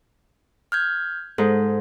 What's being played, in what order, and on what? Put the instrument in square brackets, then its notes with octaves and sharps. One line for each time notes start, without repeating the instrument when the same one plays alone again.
[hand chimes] F6 G6 G#6
[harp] G#2 [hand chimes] A4